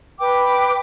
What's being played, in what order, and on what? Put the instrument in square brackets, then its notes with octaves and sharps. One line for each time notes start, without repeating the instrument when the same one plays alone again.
[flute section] B4 G5 D6